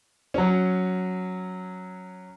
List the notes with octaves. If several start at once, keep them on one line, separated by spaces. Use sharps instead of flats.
F#3 C#4